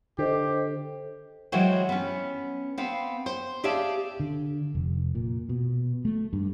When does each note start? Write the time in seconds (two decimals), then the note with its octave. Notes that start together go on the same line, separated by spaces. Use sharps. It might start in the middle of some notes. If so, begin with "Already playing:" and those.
0.18 D3 G4 A4 C5 D#5
1.52 E3 F#3 G#3 F#4 C5 G5
1.89 B3 C#4
2.78 B3 C4 F5
3.26 C5
3.64 G4 G#4 D5 E5 F5 A5
4.20 D3
4.75 F1
5.15 A#2
5.49 B2
6.05 A3
6.33 G2